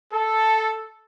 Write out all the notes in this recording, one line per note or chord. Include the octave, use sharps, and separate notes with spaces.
A4